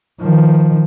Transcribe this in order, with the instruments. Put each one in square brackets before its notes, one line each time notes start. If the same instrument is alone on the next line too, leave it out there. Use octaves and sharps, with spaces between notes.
[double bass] D#3 F3